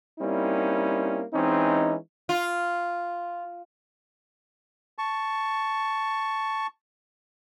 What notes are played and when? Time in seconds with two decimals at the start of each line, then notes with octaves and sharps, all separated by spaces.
0.20 G3 A#3 C4 C#4 D#4 E4
1.34 E3 G#3 C4 C#4 D#4
2.29 F4
4.98 A5 C#6